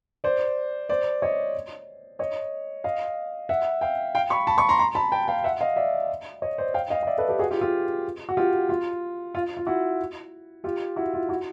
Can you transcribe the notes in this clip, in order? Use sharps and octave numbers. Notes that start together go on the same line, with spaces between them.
C5 D5
C5 D5
C#5 D#5
C#5 D#5
D#5 F5
E5 F#5
F5 G5
F5 G5
B5 C#6
A5 B5
B5 C#6
A#5 C6
A#5 C6
A5 B5
G5 A5
F5 G5
E5 F#5
D#5 F5
D5 E5
C#5 D#5
C5 D5
F5 G5
D#5 F5
F5
D5 E5
A4 B4
G4 A4
F#4 G#4
F4 G4
F4 G4
F#4
F4 G4
F4
F4
F4
E4 F#4
F4 G4
E4 F#4
F4
E4 F#4